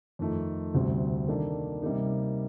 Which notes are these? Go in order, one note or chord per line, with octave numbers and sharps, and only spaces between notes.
F2 D#3 A3 D#4
D2 C3 G3 C4
D#3 A#3 D4 A4
C3 G3 A#3 D#4